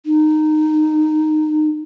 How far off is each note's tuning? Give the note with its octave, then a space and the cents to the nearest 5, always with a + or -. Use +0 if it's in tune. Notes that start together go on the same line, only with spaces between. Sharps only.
D#4 -15